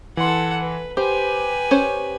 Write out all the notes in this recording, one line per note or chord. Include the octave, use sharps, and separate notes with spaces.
E3 A4 F#5 C6
B4
G4 B4 C5 G#5
C#4 C5 C#5